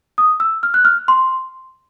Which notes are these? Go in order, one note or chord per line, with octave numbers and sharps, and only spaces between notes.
D#6
E6
F6
F#6
F6
C6